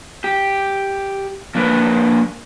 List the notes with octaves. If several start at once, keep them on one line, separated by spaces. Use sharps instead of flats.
G4
F3 A#3 D4 A#4 B4